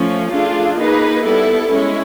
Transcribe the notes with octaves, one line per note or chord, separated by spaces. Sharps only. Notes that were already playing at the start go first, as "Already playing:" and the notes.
Already playing: F3 A3 C#4
A3 D4 F4 G#4
A#3 D#4 G#4 B4
G3 B3 E4 A4
G#3 C#4 E4